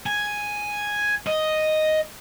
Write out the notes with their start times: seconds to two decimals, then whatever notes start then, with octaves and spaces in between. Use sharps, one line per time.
0.06 G#5
1.27 D#5